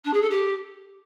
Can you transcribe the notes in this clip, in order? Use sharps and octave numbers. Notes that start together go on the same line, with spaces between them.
D4
G#4
A4
G4